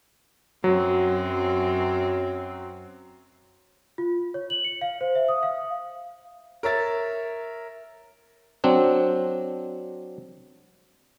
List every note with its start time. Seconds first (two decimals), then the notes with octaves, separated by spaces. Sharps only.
0.64 F#2 F#3 C4
3.98 F4
4.34 C#5
4.50 F#7
4.64 C#7
4.81 F5
5.01 C5
5.15 E5
5.28 D#6
5.43 F5
6.63 A#4 C#5 E5 A6
8.64 F#3 C4 D4